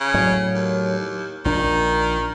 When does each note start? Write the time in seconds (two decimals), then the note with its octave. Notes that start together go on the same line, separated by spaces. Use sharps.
0.01 C#3
0.14 A2 F#3
0.55 D#2
1.45 A#1 A#2 D#3 D4